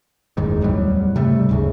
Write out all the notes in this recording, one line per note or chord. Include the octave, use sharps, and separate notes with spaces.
F#1 E2 G#2 D#3
D1 E2 F#3 G3
G#2 C3 G3 A3
D1 G#2 C#3